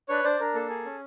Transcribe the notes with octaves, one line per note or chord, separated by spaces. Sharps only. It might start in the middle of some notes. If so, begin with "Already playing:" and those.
D4 B4 C#5
D4 C5 D5
D4 A#4
A#3 A4
G#4
C#4